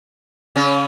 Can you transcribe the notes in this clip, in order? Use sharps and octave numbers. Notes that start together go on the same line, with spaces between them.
C#3 C#4